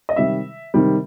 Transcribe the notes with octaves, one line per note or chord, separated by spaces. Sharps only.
D#5
C3 D#3 G3 E5
C3 D#3 G3